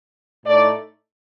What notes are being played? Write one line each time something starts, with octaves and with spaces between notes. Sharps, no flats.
A2 A3 D#4 D5